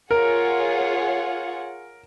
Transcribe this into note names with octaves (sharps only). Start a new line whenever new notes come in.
F4 G#4 A#4 C#5 F#5